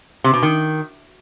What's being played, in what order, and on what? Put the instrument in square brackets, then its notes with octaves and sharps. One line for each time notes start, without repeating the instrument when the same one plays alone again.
[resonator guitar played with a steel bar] C3
B2
D#3